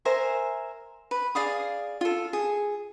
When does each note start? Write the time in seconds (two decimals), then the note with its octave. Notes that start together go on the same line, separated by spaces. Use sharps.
0.05 A#4 C5 E5 G#5
1.11 B4
1.35 G#4 D5 F5 D#6
2.01 F4 A4
2.33 G#4